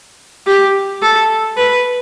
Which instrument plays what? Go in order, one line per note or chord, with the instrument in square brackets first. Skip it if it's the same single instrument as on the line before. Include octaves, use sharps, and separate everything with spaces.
[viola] G4
A4
B4